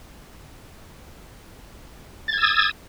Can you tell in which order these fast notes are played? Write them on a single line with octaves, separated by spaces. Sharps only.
A6 G#6 E6 D#6